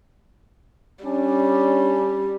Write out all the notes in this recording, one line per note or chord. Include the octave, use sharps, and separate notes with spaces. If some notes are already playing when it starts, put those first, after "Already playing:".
G3 C#4 D4